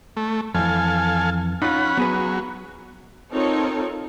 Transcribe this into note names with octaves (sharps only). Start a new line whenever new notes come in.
A3
F2 E3 A4 F5 G#5
C#4 D#4 F4 F#5 B5
F#3 B3 G#4 B4
C4 D#4 F4 A4 A#4 C#5